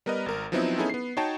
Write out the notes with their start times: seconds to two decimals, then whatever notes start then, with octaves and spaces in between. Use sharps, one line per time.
0.06 G3 B3 A#4 B4 D#5
0.26 G#1 A#4
0.52 F3 F#3 B3 C4 D#4 E4
0.78 B3 C#4 D#4 E4 G#4 A4
0.89 B3 C7
1.17 D#4 F#4 C#5 G5 A5